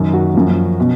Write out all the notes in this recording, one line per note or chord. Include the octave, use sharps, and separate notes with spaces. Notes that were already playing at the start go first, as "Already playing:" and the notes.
Already playing: F#2 D#3
F#4
F#2 F3
B2